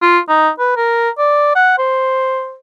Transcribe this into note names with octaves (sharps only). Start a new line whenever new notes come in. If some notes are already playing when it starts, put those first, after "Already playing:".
F4
D#4
B4
A#4
D5
F#5
C5